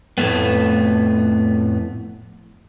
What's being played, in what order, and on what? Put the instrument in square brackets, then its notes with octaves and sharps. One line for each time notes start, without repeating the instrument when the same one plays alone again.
[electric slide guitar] F2 A2 C3 A3 B3